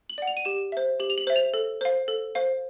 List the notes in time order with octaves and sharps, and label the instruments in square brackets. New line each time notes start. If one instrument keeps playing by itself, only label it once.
[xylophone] F#7
D5 F#5
F7
D#7
G4 E7
C5 E5
G4 F#7
F7
F#7
C5 E5
F7
A4
C5 F5
A4
C5 F5